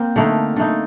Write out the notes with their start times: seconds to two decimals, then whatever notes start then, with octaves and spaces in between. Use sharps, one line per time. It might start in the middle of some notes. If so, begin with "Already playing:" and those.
Already playing: A#3 C4
0.16 D3 A3 D#4 A#4
0.56 D3 A3 D#4